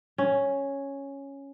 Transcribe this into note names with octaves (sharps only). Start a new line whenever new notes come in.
C#4